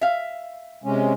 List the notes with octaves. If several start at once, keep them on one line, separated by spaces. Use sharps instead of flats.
E5 F5
C3 G#3 C#4